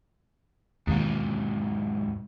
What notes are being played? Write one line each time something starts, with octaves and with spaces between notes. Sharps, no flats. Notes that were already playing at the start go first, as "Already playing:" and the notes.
D#2 G#2 B2